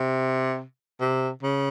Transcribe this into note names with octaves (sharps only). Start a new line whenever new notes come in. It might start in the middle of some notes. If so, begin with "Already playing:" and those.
Already playing: C3
C3
C#3